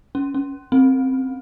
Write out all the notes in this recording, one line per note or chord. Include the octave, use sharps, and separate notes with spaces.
C#4
C#4
C4